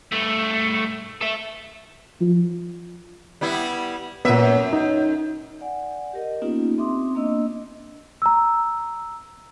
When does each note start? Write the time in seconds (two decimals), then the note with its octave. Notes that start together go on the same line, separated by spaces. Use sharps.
0.12 G2 A3
1.21 A4 E5
2.21 F3
3.41 G3 B3 E4
4.25 F#2 A#2 B3 E5
4.73 D#4
5.61 D5 F#5 G#5
6.13 G4 A#4 D#5
6.42 A#3 B3 C#4 D#4 F4 G4
6.78 C4 E5 C6 D6 D#6
7.15 A#3 B3 D4 D#5 E6
8.22 A#5 E6